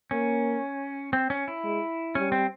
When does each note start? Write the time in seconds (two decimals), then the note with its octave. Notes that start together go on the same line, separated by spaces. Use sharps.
0.11 A#3 C#4
1.13 C4
1.30 C#4
1.48 E4
1.64 G#3
2.15 G3 C#4
2.32 C4